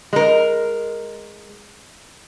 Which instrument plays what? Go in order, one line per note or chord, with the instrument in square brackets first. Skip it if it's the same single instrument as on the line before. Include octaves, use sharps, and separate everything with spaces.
[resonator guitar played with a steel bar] G#3 A#4